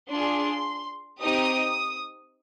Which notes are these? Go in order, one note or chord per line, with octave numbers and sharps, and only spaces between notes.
D4 F4 G#4 C6
C4 D#4 G4 D#6